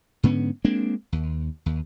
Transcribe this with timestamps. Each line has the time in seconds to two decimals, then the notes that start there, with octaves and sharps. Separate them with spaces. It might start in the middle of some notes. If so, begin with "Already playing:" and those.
0.23 G#2 D3 B3 C#4
0.65 G#3 A#3 C4 D4
1.12 D#2
1.66 D#2